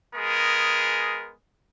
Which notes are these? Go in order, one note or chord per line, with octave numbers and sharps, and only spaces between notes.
G#3 B3 G#4 A#4